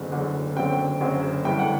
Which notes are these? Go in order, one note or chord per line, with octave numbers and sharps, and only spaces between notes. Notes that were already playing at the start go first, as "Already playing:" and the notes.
Already playing: F#1 E2 D3 F#3
F#1 E2 D3 F#3
F#1 F#2 D3 F#3 C4 G5
F#1 F#2 D3 F#3 C4
G1 G2 E3 A3 G5
F#5